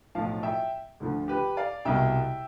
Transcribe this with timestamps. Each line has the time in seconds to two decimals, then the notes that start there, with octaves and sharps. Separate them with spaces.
0.15 B1 A2 F3 F5 A5
0.43 E5 G5
1.00 D2 D3 F3
1.28 G4 B4
1.57 D5 F5
1.85 C2 B2 E5 G5